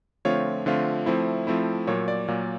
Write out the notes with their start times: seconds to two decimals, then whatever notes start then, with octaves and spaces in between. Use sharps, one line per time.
0.25 D3 F3 A3 C4 F4 C#5
0.66 D3 F3 A3 C4 F4
1.06 F3 A3 C4 E4
1.47 F3 A3 C4 E4
1.87 A#2 F#3 A#3 C#5
2.08 D5
2.28 A#2 F#3 A#3